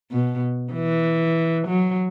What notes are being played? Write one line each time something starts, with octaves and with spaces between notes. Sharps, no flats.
B2
E3
F#3